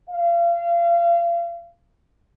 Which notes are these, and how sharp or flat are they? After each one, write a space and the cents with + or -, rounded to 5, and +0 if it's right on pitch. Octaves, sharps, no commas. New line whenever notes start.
F5 -30